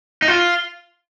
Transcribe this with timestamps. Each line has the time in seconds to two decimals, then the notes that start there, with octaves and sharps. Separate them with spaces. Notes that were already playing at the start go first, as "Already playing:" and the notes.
0.22 D#4
0.28 F4